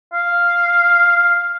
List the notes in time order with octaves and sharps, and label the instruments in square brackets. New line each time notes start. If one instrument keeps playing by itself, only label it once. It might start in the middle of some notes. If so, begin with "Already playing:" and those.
[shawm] F5